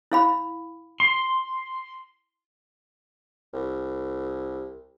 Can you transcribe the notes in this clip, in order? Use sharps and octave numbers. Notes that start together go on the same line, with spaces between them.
E4 F5 B5
C6
C2